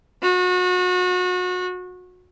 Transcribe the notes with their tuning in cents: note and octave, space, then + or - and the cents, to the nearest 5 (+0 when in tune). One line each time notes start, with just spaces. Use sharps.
F#4 -30